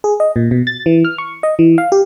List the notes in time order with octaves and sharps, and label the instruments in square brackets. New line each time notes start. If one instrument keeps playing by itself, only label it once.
[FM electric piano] G#4
D#5
A#2
B2
A6
E3
F6
C#6
D#5
E3
F5
G4